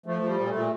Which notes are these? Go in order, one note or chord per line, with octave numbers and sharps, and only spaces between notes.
F3 A3
F3 G3
A#2
A3
A#2